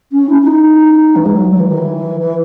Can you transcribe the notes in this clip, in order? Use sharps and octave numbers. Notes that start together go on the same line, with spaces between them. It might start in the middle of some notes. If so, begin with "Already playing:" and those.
C#4
E4
E4
D#4
E3
G#3
F#3
F#3
E3
D#3
E3
E3